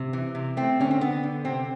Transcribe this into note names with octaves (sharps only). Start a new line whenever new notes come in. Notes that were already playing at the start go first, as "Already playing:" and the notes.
Already playing: C3
E3
C3
A3 C4
D3 C#4
C4
D3 B3
D3
C3 C4